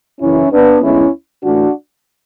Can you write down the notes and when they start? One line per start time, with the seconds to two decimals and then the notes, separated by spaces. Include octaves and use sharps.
0.21 F#2 C#3 E3 C#4 E4
0.52 B3 D4
0.82 D2 D3 G#3 B3 C#4 E4
1.43 A2 E3 A3 D4 F#4